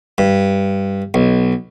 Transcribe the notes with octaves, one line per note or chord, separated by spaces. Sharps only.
G2
B1